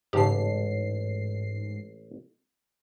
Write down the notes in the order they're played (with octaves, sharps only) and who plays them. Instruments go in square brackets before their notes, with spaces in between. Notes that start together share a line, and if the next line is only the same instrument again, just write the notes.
[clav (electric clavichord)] A1 A4 A5 [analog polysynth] G#2 C7 [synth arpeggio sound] C#3 G4